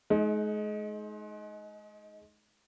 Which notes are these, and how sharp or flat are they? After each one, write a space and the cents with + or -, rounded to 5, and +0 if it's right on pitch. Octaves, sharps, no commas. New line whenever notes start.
G#3 +35 D#4 +10